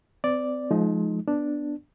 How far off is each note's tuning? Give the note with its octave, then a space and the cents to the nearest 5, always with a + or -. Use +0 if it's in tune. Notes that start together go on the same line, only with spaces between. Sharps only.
C4 -40 D5 +0
F3 +0 G#3 +30 D#4 +0
B3 +0 D4 +0